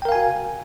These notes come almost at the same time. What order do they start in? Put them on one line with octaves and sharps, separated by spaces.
G5 A#4 F5 G#5 F#4